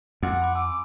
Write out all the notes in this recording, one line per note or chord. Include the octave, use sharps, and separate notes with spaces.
F2 F#5 C6 D6 D7
B5 D6
G#5 D6 E6